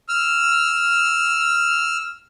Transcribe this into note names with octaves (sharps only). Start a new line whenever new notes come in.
E6 F6